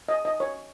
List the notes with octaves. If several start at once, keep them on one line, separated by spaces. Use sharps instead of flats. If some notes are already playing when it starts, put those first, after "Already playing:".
D#5
D#5
C#5